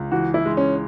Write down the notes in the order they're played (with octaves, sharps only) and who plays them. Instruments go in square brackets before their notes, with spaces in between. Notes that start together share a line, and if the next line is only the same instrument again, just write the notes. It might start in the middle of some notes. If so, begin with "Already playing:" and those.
Already playing: [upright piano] C#2
[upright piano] E3 [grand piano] F#4
[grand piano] E4
[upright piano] G#3
[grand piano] C#4